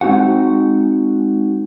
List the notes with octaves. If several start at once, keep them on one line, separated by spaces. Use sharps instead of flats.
G#3 C4 D#4 F#4 F#5